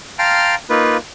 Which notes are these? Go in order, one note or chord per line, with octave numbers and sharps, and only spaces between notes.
F5 G5 A5 A#5 C6 F6
A#3 D#4 F4 B4